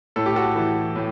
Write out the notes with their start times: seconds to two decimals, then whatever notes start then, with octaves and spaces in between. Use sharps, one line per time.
0.16 A2 A4
0.26 G4
0.36 F#4 A4
0.56 E3
0.96 A2